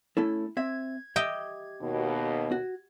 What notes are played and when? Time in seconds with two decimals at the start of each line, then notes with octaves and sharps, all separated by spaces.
0.17 A3 C#4 E4 A4
0.57 C4 E5 G#6
1.16 G4 D#5 E5 G5
1.81 D#2 B2
2.52 F#4